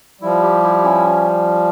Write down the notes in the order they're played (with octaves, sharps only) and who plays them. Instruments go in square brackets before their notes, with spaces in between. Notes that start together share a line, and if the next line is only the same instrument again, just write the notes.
[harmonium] F3 G3 [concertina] E4
[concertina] G4
E4
C#4